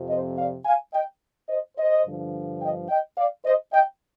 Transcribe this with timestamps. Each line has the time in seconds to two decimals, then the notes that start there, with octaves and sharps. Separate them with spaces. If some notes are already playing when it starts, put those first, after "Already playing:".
Already playing: F2 C3 F3
0.09 C5 D#5
0.37 D5 F5
0.65 F5 G#5
0.93 D#5 G5
1.49 C5 D#5
1.77 C5 D#5
2.05 G2 D3 F3
2.61 D#5 G5
2.89 D#5 G5
3.17 D5 F5
3.45 C5 D#5
3.73 D#5 G5